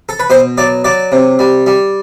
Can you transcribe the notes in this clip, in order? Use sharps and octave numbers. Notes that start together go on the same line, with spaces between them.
A4
B4
B2 C5
F#3 D5
F#3 D5
C3
G3
G3